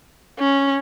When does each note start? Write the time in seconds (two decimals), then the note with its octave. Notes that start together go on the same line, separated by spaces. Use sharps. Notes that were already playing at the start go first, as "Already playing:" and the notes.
0.39 C#4